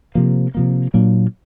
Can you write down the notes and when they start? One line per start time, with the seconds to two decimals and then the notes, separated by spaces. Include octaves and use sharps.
0.15 C3 F3 A#3
0.55 C3 F3 A#3
0.94 A#2 F#3 A#3 D4